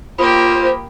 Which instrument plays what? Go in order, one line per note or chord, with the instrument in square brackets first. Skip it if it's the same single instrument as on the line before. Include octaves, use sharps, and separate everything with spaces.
[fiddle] A#3 G4 [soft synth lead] F4 [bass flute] C5 [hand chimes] B5 D#6